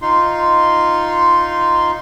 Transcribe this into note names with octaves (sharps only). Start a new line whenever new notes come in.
D#4 F4 C6